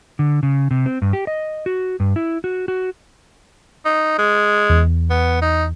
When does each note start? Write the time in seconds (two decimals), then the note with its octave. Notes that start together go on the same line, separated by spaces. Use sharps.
0.19 D3
0.43 C#3
0.71 C3
0.86 C4
1.02 G2
1.13 G4
1.27 D#5
1.66 F#4
2.00 G2
2.16 E4
2.44 F#4
2.68 F#4
3.85 D#4
4.19 G#3
4.69 E2
5.10 B3
5.42 D#4